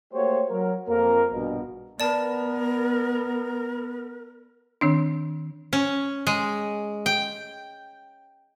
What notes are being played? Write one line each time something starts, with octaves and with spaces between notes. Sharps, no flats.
A3 A#3 F#4 G4 C5 C#5
F#3 A#4
F2 A#3 A#4
A#1 G2 B2
B3 A#4 D5 A5
D#3 C4 D4
C#4
G#3
G5